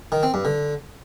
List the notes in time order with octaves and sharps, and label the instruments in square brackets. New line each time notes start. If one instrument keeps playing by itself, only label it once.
[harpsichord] D#3
C4
G2
D3